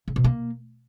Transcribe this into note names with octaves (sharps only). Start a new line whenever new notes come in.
C#3
B2
A#3